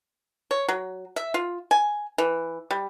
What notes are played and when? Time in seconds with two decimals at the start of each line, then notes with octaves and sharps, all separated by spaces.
0.51 C#5
0.68 F#3
1.16 E5
1.34 F4
1.71 G#5
2.18 E3
2.71 G3